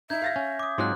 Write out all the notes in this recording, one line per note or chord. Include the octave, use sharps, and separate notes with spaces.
D#4 E5 G6 G#6
F5 A6 A#6
C#4
D6 D#6
G#2 F#3 G#3 C4 F4 C6 F#6